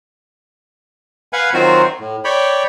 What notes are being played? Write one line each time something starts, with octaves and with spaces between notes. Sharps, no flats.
B4 F5 F#5 G#5
D#3 F#3 C4 F4 F#4 C5
A2
C#5 D5 G5 B5